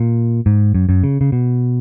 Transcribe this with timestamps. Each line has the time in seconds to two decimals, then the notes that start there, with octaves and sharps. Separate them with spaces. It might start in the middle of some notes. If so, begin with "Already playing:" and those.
Already playing: A#2
0.46 G#2
0.74 F#2
0.89 F#2
1.03 C#3
1.21 C#3
1.32 B2